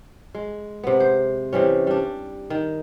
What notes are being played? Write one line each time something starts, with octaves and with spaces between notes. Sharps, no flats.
G#3
C3 B3
C5
C3 E3 G3 C#4
G3 D4
D#3